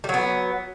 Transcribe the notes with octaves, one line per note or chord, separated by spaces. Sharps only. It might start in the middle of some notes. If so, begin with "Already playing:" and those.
F#3 G3 B3